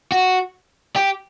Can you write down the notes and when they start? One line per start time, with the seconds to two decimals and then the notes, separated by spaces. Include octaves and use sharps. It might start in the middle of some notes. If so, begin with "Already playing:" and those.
0.12 F#4
0.96 G4